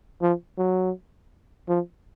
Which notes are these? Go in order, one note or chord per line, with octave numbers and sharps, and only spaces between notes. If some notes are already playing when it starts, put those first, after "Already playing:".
F3
F#3
F3